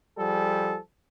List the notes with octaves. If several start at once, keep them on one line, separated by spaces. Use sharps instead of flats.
F3 G3 G#4 A4